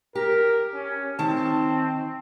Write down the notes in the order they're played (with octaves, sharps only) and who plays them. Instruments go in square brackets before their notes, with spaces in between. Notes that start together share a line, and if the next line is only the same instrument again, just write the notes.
[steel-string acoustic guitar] G4 [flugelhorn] A#4
[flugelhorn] C#4
[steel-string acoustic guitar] D#3 A5 [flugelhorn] C4